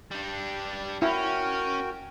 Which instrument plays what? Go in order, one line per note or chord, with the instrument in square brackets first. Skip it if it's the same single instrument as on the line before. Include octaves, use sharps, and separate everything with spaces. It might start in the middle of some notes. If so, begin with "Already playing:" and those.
[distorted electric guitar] G3 D4
[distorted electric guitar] C#4 [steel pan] E4 [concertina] F#4 A#4 G5